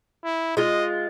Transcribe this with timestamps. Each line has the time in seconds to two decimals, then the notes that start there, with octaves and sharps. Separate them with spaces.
0.24 E4
0.57 G#3 F4 D#5